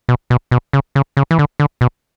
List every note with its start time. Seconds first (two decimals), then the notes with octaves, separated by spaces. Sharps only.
0.09 B2
0.30 B2
0.51 B2
0.73 C#3
0.95 C#3
1.17 C#3
1.31 E3
1.39 D3
1.60 D3
1.81 B2